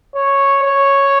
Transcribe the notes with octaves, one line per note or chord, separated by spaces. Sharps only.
C#5
C#5